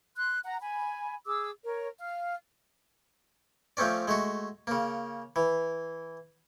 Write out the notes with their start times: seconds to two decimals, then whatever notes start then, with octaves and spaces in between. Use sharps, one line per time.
0.16 C6 F#6
0.44 F#5 A#5
0.60 G#5 B5
1.26 G#4 D6 E6
1.64 A#4 C#5
1.98 F5
3.77 F3 A3 C4 C#4 D5
4.08 G#3 A3 F#4
4.67 C#3 A#3
5.36 E3